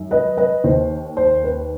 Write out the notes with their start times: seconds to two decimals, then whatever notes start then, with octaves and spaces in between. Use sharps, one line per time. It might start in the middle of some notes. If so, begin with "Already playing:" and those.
Already playing: F#2 D#3
0.11 B4 D#5
0.37 B4 D#5
0.64 D#2 D#3 C5
1.17 C5
1.44 B4